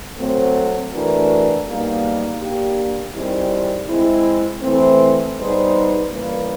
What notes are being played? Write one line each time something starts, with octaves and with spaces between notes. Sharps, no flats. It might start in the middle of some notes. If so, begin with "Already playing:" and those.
F#3 A3 C4
E3 A3 D4 F#4 A#4
B2 G3 A#3 D#4 G#4
A#3 D4 G4
D#3 G3 C4 E4 G#4
G#3 C4 E4
E3 A3 C4
G3 B3 D#4 G#4 C5
C#3 E3 G3 A#3